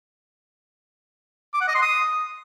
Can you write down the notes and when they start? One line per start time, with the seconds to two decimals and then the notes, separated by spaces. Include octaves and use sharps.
1.54 D6
1.61 F#5
1.68 D#5
1.75 C6
1.82 D#6